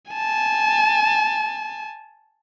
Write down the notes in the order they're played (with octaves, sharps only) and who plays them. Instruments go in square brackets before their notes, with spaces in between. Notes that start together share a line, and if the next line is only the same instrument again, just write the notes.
[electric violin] G#5 A5